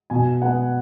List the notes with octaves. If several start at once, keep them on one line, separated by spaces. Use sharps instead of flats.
B2 G#5
B3 F#5